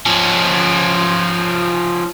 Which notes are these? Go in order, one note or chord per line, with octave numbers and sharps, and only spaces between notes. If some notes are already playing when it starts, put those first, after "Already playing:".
F3 C#4